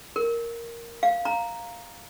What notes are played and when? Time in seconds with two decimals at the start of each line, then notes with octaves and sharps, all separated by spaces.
0.16 A#4
1.03 F5
1.25 A#5